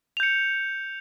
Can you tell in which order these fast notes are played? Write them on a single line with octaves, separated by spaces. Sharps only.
F7 G6 C#7